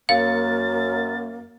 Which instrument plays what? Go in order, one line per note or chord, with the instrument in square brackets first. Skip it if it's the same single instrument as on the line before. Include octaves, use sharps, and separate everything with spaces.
[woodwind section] F#2 [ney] A#3 [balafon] F5 [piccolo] A6